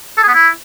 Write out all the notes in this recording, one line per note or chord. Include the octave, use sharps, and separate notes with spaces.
A4
G#4
B3
E4